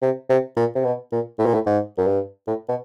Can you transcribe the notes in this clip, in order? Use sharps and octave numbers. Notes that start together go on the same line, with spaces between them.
C3
C3
A#2
C3
B2
A#2
A2
A#2
A2
G#2
F#2
G2
A2
B2